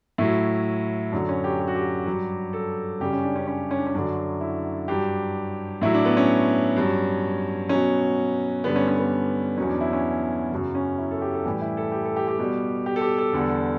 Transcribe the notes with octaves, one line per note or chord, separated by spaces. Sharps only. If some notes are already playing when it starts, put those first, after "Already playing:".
A2 F#3 E4
F#2 D3 F#3
C#4
G4
G4
F#4
G4
G2 F#3
A4
F#2 C#3 G3 G4
C#4
D4
C#4
C#4
C#4
D4
C#4
F#2 D3 F#3 D4
E4
G2 F#3 G4
A2 F#3 E4
D4
B3
C#4
G2 F#3
B2 F#3 C#4
G2 D3 G3 B3
C#4
C#4
B3
E2 B2 F#3 C#4
D4
E4
C#4
F#2 C#3 F#3
C#4
E4
A4
G4
A4
A2 E3 G3 G4
E4
A4
G4
A4
G4
G4
B2 G3
G4
A4
G4
A4
E2 D3 G3